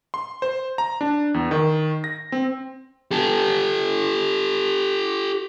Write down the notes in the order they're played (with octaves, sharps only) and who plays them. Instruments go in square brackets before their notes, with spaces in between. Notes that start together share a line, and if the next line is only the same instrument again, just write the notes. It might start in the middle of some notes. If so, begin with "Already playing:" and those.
[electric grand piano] C6
C5
A#5
D4
E2
D#3
A#6
C4
[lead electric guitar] G4 A4